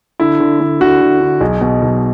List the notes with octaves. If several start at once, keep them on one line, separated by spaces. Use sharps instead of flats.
D3 E4
D3
D3
D3 F#4
D3
D3
B1 G#4
B2
B1